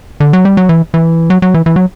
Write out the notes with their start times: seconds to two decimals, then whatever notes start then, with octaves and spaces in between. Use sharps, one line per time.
0.20 D3
0.33 F#3
0.45 G3
0.57 F#3
0.69 E3
0.94 E3
1.30 F#3
1.42 F#3
1.54 E3
1.66 E3
1.76 F#3